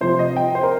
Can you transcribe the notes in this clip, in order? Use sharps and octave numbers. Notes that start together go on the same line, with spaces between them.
C3 F3 C5
D#5
G5
C5
A#4